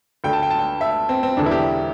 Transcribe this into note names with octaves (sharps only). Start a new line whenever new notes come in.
D2 D3 G5
A5
G5
A5
G5
E5
C4
C4
E1 E2 D3 D4
E4
G4